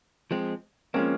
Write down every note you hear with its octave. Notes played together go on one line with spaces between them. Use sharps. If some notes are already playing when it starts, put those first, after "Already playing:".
F3 G#3 C4
F3 G#3 A#3 C4 C#4